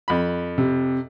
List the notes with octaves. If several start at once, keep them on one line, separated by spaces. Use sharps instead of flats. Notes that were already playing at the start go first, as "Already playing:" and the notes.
F2 B5
C3